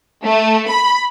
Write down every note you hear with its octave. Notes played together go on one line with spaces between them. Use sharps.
A3
B5